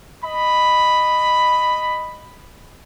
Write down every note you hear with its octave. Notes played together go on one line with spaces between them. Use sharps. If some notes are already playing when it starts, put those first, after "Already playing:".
D#5 B5